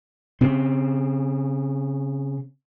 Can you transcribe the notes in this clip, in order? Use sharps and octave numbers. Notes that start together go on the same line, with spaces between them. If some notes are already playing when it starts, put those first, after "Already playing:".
C#3 C4